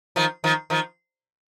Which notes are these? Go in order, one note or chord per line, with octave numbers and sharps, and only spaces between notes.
D#3 F3
D#3 F3
D#3 F3